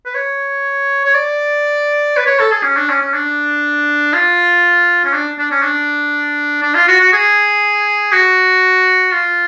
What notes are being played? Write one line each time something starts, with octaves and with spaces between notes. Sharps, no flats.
B4
C#5
C#5
D5
B4
C#5
A4
G#4
C#4
D4
C#4
C#4
D4
F4
C#4
D4
D4
C#4
D4
D4
F4
F#4
F#4
G#4
F#4
F4